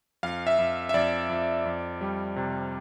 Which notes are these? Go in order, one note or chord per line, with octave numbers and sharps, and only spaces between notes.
F2 F5
E5
F2
E5
F2 D5
F2
F2
G3
C3